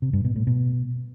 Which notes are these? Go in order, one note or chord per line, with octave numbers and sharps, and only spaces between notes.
C3
G2
B2
A2
B2